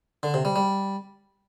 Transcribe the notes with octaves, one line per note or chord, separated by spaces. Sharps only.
D3
C3
G3
G3